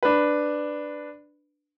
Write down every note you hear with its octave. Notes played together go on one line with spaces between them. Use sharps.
D4 B4